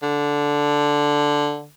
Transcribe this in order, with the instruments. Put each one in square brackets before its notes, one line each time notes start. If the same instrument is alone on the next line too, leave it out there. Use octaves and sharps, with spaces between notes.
[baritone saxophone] D3